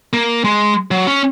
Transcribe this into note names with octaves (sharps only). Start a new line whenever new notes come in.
A#3
G#3
F#3
C#4